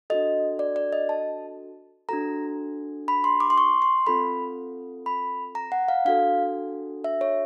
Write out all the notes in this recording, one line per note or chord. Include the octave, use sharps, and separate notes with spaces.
D4 F#4 A4 D#5
D5
D5
D#5
A5
D4 F#4 A4 A#5
B5
C6
D6
C6
C#6
C6
C4 F4 A4 B5
B5
A#5
F#5
F5
D4 F#4 A4 F5
E5
C#5